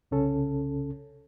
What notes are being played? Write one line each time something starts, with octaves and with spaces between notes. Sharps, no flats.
C2 C#3 C#4 A4